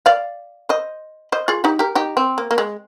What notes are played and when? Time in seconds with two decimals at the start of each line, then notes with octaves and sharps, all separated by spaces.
0.06 D5 F5
0.69 C5 D#5
1.32 C5 D#5
1.48 F4 G#4
1.64 D#4 G4
1.79 G4 A#4
1.95 D#4 G4
2.17 C4
2.38 A#3
2.51 A#3
2.58 G#3